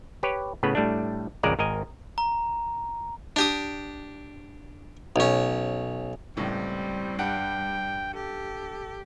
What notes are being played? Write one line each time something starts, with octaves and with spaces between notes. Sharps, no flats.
G4 B4 C#5
A2 C#3 B3 B4
A2 G3 A3 D4
G#1 C#2 F3 G#3 A#4 D5
G#1 A#4 D#5 G#5
A#5
D4 G4 D#6
B1 C#4
C#2 A2 G3 C4
G2 F#5 G5 D7
G4 A4